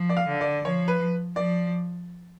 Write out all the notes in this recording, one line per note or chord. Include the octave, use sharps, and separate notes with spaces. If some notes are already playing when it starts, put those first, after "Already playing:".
Already playing: F3
D5
F5
D3
D5
F3 C#5
B4
F3 D5